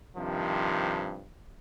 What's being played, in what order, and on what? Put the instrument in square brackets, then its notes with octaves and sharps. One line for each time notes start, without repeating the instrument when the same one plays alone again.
[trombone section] G2 C3 D#3 F3